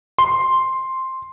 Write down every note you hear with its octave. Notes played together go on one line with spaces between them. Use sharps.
C6